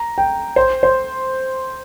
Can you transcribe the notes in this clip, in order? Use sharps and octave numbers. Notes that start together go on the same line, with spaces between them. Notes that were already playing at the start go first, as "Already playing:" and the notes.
Already playing: A#5
G5
C5
C5